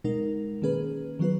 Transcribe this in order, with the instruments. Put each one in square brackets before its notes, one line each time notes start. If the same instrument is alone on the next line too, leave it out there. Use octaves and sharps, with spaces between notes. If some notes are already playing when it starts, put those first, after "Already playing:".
[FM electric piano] B2 G#3 D#4 A#4
D#3 A#3 C#4 G#4 B4
D#3 F#3 B3 F4 B4